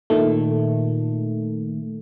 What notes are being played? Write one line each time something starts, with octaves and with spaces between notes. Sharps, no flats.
A#2 D#3 A3